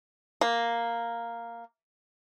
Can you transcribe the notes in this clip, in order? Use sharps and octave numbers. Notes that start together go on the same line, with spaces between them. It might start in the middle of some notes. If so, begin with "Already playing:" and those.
A#3